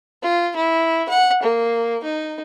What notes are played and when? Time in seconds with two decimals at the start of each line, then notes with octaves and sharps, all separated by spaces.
0.23 F4
0.56 E4
1.09 F#5
1.43 A#3
2.04 D#4